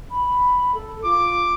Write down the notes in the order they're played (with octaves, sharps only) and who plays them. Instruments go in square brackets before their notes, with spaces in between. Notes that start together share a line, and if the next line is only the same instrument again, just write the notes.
[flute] B5
A4
[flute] F4 [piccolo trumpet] D6